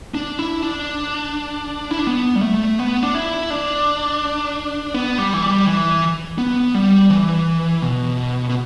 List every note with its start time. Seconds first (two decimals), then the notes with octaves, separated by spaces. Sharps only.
0.15 D4
0.39 E4
0.62 D4
1.91 E4
1.99 D4
2.07 B3
2.35 G3
2.42 A3
2.79 B3
3.03 D4
3.15 E4
3.50 D4
4.94 B3
5.18 G3
5.33 E3
5.42 G3
5.66 E3
6.38 B3
6.74 G3
7.10 E3
7.82 B2
8.49 B2